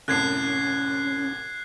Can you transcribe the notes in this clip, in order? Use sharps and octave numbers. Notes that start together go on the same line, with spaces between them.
C2 F#2 A2 C#4 F#6 G#6 C7